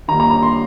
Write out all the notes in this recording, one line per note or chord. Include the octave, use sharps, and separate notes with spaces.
D#3 G3 A#3 A#5
A#5
A#5
C6